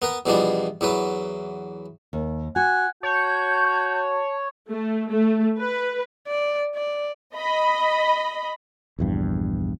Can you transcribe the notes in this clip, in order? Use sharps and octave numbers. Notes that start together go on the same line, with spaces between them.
B3 A#4 B4
E2 B2 E3 F3 G3 D4
E2 E3 F#3 B4
D#2
F#4 F#5 G#5
F#4 C#5 A5 G6
A3
A3
B4
D5
D5
D#5 B5
A#1 E2 G2